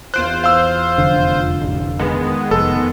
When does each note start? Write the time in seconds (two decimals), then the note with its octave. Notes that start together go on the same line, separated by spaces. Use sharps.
0.14 E2 F4 C5 F#6 D7
0.44 F5 E6
0.98 F1 D3
1.61 A1
1.99 D#3 G#3 B3
2.51 F1 A4